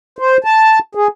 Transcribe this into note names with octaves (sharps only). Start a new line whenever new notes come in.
C5
A5
G#4